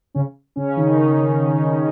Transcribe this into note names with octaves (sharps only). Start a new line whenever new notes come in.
C#3 C#4
C#3 C#4
D#3 D#4